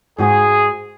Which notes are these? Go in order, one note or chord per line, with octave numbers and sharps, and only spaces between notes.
G#2 F#4 G#4 G#5